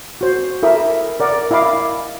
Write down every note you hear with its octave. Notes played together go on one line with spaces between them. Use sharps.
F#4 C5
E4 A4 A#4 E5 D#6
A#4 D5 F#5
E4 D#5 F5 B5 D6